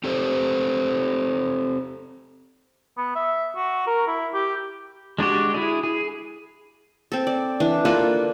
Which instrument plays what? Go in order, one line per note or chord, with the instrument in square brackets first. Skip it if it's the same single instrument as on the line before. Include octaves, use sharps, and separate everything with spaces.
[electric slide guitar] C4 G4 A4 C5
[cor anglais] B3
E5
F#4
A#4
E4
G4
[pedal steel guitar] G#3 D4 F#4 G4
E4 G#4
G#4
[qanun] C4 A4
D5
E3 D4
A#3 F4 A4 B4